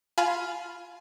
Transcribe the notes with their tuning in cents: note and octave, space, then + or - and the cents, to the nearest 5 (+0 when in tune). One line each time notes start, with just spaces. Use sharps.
F4 +0 G#5 +20 B5 +0